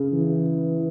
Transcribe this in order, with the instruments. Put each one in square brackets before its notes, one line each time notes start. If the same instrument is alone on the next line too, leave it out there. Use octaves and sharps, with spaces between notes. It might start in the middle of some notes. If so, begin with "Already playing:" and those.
Already playing: [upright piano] C#3
[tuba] E3